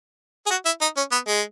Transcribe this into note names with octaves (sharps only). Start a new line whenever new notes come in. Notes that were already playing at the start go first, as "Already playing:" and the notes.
G#4
F#4
E4
D#4
C#4
B3
G#3